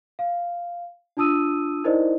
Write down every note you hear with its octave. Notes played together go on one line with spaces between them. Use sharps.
F5
D4 F4 A5 D#6 E6 D#7
D#4 E4 A#4 C5 D5 D#5